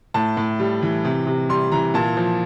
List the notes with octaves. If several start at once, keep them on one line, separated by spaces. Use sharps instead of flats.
A2 A5
A2
G3
E3
C3
C3
G3 C6
E3 A#5
A#2 A5
F3